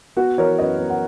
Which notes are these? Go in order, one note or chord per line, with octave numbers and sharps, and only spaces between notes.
B3 F#4
E3 A#4 C#5
F#2 B4 D#5
B3
F#5